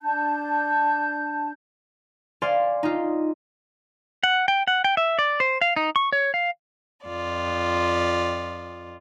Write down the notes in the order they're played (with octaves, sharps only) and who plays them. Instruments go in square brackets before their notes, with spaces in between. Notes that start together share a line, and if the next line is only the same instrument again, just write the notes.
[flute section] D4 A5 G6
[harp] D5 F5 G#5 C6
D#4 F4
[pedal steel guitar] F#5
G5
F#5
G5
E5
D5
C5
F5
D#4
C#6
C#5
F5
[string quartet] F2 F4 D5